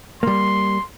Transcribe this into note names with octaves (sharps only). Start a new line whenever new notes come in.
G3 A#3 C6